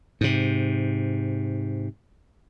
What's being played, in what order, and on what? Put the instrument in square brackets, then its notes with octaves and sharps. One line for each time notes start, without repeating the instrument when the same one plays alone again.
[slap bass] G#2 C3